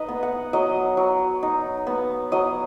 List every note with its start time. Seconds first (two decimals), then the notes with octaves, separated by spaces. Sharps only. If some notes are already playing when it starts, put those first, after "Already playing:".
Already playing: D#4 B4 D#5
0.08 B3
0.23 F#5
0.53 F#3 D#5
0.97 F#3
1.43 D#4
1.87 B3
2.32 F#3 D#5